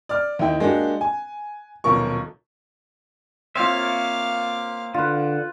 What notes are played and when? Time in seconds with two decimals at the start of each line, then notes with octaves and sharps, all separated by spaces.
0.09 D5 F6
0.39 D#2 D#4 E4 G5
0.60 G#3 A#3 D4 F#4 G4
1.01 G#5
1.84 D#1 B1 F3 A#4 C#6
3.56 A#3 C4 F4 C#5 E5 F5 D6
4.94 D3 F4 B4